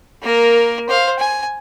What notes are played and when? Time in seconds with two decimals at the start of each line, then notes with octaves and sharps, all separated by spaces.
0.22 A#3 A#4
0.89 C5 F5
1.19 G#5